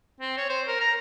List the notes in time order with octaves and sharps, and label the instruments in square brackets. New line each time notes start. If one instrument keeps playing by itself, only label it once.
[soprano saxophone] C4
C#5
C5
A#4
A#5